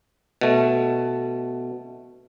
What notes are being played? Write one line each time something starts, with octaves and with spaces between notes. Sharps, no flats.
B2 A3